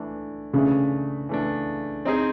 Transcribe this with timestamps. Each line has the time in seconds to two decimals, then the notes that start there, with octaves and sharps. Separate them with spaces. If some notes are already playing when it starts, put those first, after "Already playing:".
Already playing: E3 A3 D4
0.53 C#3 E3 A3 D4
1.29 E3 A3 D4
2.05 C4 D#4 G#4